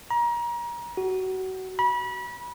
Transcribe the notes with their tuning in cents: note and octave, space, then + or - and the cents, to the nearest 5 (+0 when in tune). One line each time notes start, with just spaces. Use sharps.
A#5 +30
F#4 +25
B5 -30